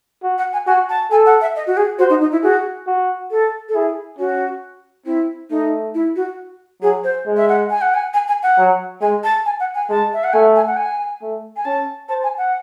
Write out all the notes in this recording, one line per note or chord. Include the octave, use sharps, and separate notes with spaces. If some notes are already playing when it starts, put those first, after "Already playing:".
F#4
F#5
G#5
F#4 G#5
A5
A4 G#5
F#5
E5
D#5
F#4
G#4
F#4 C5
D#4
D#4
E4
F#4 G#4
F#4
A4
A4
E4 G#4
C#4 F#4
C4 E4
A3 D#4
E4
F#4
F#3 G#4
C5
G#3
E5
F#5
G#5
F#5
G#5
G#5
G#5
F#5
F#3
G#3 G#5
A5
G#5
F#5
G#5
G#3 A5
E5
F#5
A3 G#5
G#5
F#5
G#5
A3
G#5
C#4 A5
C5 A5
G#5
F#5